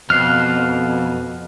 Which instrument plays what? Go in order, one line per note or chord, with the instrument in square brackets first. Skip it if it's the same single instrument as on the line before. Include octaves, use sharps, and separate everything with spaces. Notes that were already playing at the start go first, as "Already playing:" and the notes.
[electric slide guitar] F2 [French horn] B2 [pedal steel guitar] F6 [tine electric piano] F#6 C7